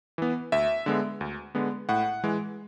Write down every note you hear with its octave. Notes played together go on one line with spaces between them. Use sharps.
E3 B3
D2 E5
D3 G#3 B3
D2
D3 G#3 B3
A2 F#5
E3 G#3